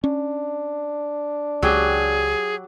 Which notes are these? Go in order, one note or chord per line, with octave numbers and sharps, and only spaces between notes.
C#4 D4
C#2 F#3 G4 G#4